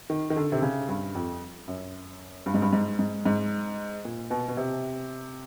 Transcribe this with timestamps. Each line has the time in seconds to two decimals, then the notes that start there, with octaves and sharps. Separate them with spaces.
0.10 D#3
0.30 D#3
0.36 D3
0.52 C3
0.62 C#3
0.88 G2
1.15 F2
1.68 F#2
2.46 G2
2.54 G#2
2.62 G2
2.73 G#2
2.99 G#2
3.26 G#2
4.05 A#2
4.30 B2
4.48 B2
4.57 C3